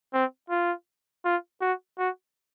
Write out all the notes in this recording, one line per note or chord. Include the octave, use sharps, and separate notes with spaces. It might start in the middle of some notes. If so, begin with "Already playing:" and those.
C4
F4
F4
F#4
F#4